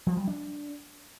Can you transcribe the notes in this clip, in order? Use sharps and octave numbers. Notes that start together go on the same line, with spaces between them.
F3
G3
D4